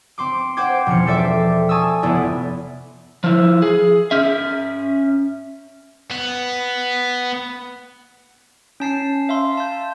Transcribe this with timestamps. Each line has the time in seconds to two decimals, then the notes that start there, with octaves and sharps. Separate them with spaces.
0.18 C4 C6 D6
0.57 C5 F#5 G5 D6 G#6
0.86 E1 F3 C#4 C#7
1.07 A4 C5 D5 E5 G5 D6
1.69 G#5 A5 C#6 D#6 E6
2.02 F1 B3 E4 D5
3.24 F3 E4
3.62 G#4
4.11 C#4 E5
6.11 B3
8.80 C#4 A5 C7
9.29 E5 F5 C6
9.57 A5 G6